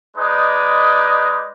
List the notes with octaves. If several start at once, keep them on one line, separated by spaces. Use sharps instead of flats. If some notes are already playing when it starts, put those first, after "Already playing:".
G#3 D#4 B4 D5 D#5